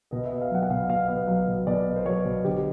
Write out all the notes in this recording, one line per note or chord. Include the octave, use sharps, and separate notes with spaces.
B2 D#5
E5
B3
F5
F#3 F#5
F#5
B2 F5
B2 F5
B3 F5
F#3 F5
B2
B2 D5
B3
C5
F#3 C#5
B2
D3 G4